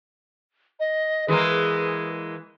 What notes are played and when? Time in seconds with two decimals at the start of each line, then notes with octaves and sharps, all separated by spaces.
0.80 D#5
1.28 E3 G#3 A#3 G#4